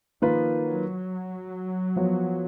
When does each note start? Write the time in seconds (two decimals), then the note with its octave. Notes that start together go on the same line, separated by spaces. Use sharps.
0.22 D#3 F3 A#3 F4 B4
0.65 F#3
1.96 F3 B3 F#4 C#5